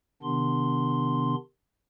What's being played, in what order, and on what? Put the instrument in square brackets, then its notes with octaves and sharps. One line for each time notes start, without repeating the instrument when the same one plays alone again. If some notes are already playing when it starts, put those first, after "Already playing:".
[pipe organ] C3 D#3 B3 D4 C6